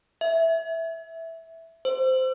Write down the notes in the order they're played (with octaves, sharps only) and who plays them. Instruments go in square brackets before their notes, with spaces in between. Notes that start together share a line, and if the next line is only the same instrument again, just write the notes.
[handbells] E5
C5